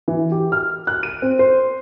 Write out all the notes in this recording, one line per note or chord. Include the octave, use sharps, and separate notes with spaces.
E3
G4
F6
F#6
D#7
C4
C5